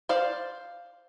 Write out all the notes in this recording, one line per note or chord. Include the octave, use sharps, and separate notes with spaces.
C5 D5 F5